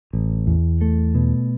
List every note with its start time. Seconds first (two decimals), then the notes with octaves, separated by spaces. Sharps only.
0.13 A1
0.47 E2
0.81 A3
1.15 B2